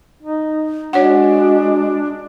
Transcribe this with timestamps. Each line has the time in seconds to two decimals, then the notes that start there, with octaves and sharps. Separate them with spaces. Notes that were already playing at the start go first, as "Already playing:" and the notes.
0.23 D#4
0.93 G#3 D4 F#4 C#5 F#5